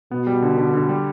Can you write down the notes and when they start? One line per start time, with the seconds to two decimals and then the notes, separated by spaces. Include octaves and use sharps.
0.11 B2 B3
0.27 G3
0.42 D3
0.57 D3
0.74 D3
0.89 G3